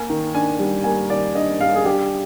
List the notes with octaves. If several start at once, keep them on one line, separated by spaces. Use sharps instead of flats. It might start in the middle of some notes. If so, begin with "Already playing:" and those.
Already playing: A#3 G#5
D#3
D4 G#5
G3
A#3 G#5
D#3 D5
D4 D#5
G3 F5
G#4
D4 G4